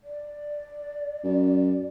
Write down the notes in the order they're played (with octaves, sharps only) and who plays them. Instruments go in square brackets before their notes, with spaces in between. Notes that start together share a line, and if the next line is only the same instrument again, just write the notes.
[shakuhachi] D5
[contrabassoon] F#2